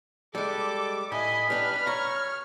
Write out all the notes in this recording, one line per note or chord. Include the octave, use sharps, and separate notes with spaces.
G3 G#3 A4 D6
A2 D#5 G#5 B5
G3 D4 B4 F6
C#5 A#5 C#6